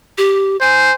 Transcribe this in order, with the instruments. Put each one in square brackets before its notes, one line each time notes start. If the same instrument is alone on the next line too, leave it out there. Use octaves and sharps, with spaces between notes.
[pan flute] G4
[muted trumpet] C5 [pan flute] G#5